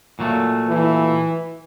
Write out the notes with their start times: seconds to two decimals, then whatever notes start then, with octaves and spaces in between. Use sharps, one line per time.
0.19 A#2 F#3 A3
0.68 E3